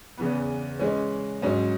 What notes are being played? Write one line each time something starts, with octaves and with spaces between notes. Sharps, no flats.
E2 C#3 E3 B3
E3 G#3 C#4
G#2 F#3 C#4